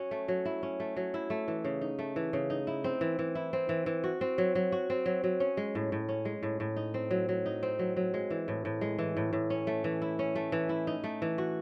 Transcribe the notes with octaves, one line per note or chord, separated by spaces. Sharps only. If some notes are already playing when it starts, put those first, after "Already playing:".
Already playing: F#3 C#4 F#4
A3
F#3
E4
C#4
A3
F#3
E4
A3
E3
C#3
D#4
A3
E3
C#3
D#4
E4
C4
E3
E3
E4
C4
E3
E3
F#4
C4
F#3
F#3
F#4
C4
F#3
F#3
C#4
G#3
A2
A2
C#4
G#3
A2
A2
D#4
C4
F#3
F#3
D#4
C4
F#3
F#3
G#3
E3
A2
A2
G#3
E3
A2
A2
C#4
A3
E3
E4
C#4
A3
E3
E4
D#4
A3
E3
F#4